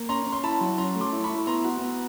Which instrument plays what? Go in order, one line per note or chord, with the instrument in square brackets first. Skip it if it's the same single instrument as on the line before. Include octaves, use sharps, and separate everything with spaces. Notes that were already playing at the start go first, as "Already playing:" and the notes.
Already playing: [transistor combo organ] A#3
[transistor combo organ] C#4 [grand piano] A#5 C6
[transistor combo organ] C#4
[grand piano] C6
[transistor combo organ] E4 [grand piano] A5 B5
[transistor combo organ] F#3
[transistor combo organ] C#4 [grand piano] A#5 C6
[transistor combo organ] A3
[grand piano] C6 D6
[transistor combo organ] E4
[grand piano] B5 C#6
[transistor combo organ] E4
[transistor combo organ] B3 [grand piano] A#5 C6
[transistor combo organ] F#4
B3